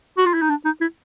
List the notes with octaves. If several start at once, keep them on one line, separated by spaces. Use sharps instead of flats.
F#4
F4
E4
D#4
D4
D#4
E4